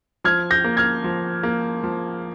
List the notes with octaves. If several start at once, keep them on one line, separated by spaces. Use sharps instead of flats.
F3 F6 G#6
G6 A#6
A#3
F6 G#6
F3
A#3
F3